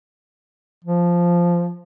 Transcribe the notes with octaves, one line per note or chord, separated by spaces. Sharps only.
F3